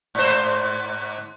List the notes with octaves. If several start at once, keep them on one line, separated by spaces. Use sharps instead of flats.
G#2 C5